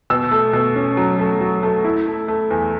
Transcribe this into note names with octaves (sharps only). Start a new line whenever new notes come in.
B2 E6
A3
B2
C#4
F#3
A3
F#3
A3
E4
A3
A3
E2